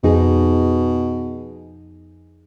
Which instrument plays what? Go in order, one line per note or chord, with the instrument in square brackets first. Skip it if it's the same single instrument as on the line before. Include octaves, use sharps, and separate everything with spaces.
[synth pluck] F2 D#4 G#4 [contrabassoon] B2